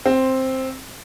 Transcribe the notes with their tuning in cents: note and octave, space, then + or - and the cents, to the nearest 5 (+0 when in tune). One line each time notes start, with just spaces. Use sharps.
C4 +5